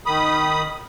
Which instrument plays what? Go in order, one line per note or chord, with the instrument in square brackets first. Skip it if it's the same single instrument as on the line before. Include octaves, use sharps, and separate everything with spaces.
[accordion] D#3 B5 D#6